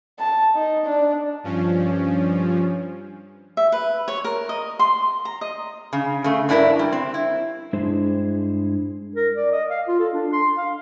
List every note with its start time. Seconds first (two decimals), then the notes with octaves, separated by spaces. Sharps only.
0.19 A5
0.55 D#4
0.86 D4
1.44 G2 F3 C#4
3.57 E5
3.72 B4
4.08 C#5
4.25 A#4
4.49 D#5
4.79 C6
5.25 A#5
5.41 D#5
5.93 C#3
6.24 C#3 A3
6.49 G2 D4 E4 G#4 A#4
6.79 G3
6.92 C4
7.14 E4
7.73 G2 G#3 D4 E4 G#4 C5
9.16 A#4
9.36 D5
9.52 D#5
9.70 F5
9.87 F4
9.99 A4
10.13 D4
10.33 C6
10.57 F5